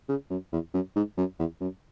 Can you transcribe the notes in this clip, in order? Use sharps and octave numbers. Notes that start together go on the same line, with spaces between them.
C#3
F#2
E2
F#2
G#2
F#2
E2
F#2